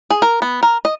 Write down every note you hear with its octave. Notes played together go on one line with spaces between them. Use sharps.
G#4
A#4
B3
A#4
D#5